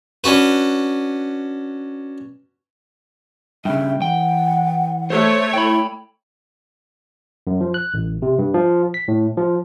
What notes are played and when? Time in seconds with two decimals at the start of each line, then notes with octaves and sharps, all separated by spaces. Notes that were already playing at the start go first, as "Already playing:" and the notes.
0.24 C#4 D4 F#4 B4
3.65 G2 C#3 E5 G5
4.02 E3 F#5 G5
5.10 A3 C5 C#5
5.53 E4 G5 B5
7.47 F#2
7.61 F3
7.74 F#6
7.94 A1
8.22 C3
8.39 G2
8.54 F3
8.94 B6
9.08 A2
9.37 F3